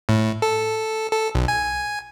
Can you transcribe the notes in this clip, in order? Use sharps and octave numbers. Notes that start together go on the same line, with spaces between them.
A2
A4
A4
B1
G#5